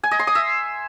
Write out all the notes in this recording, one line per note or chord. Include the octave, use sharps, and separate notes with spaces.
G#5
D#5
C6
D#6
E5